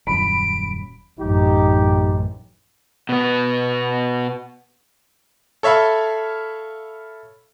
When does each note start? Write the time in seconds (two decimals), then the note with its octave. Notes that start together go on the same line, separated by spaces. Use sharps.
0.07 D#1 F#2 B5 D7
1.20 A1 F#2 D#4 G4
3.09 B2 B3
5.63 A4 C#5 E5 F5 B5